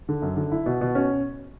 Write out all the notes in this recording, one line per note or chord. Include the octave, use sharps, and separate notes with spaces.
D3
F#2
D3
E4
B2
B2
C#4